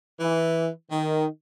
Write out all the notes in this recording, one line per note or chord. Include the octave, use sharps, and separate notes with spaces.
E3
D#3